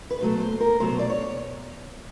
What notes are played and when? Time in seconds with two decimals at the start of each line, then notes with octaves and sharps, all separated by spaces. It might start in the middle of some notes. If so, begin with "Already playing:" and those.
0.11 B4
0.20 B2 F#3 A3 C5
0.40 C5
0.60 A#4
0.80 B2 F#3 A3 C5
0.99 D5
1.10 C#5